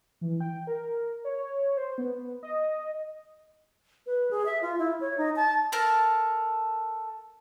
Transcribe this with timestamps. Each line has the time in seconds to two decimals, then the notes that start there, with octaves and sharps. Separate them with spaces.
0.21 E3
0.40 G5
0.67 A#4
1.25 C#5
1.77 C5
1.98 B3
2.14 B3
2.43 D#5
4.06 B4
4.31 G#4
4.46 E5
4.62 F4
4.79 E4
5.01 C#5
5.17 D#4
5.36 A5
5.72 A4 A#4 A5